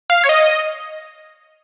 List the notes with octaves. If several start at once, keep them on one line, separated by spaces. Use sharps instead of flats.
F5
C#5
D#5